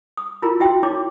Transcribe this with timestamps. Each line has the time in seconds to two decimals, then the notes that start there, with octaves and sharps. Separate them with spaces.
0.17 D#6
0.42 E4 F4 A#4 A#5
0.60 E4 F#4 E5 G5 C6
0.83 D#4 E4 C#5 D6